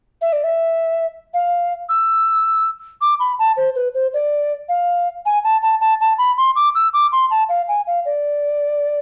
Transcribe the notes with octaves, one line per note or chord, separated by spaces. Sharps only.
E5
D5
E5
F5
E6
D6
B5
A5
C5
B4
C5
D5
F5
G#5
A5
A5
A5
A5
B5
C6
D6
E6
D6
C6
A5
F5
G#5
F5
D5